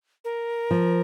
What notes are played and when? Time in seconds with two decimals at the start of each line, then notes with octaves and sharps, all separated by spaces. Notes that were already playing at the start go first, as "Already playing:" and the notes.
0.25 A#4
0.71 F3